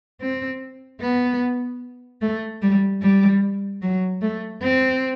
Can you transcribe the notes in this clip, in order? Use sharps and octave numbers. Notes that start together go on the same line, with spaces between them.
C4
B3
A3
G3
G3
F#3
A3
C4